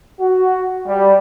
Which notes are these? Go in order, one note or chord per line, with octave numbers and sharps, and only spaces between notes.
F#4
G3